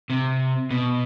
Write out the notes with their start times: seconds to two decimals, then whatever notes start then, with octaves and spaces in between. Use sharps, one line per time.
0.10 C3
0.71 B2